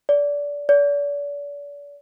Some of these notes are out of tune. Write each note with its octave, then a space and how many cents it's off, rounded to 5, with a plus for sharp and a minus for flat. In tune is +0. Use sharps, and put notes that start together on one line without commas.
D5 -25
D5 -40